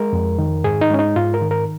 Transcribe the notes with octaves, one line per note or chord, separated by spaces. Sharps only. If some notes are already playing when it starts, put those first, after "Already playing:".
Already playing: G#3 A#4
F2
D#3
G#2 G#4
D#4
G#3 C#4
D#4
G#2 F4
A#4
D#3
A#4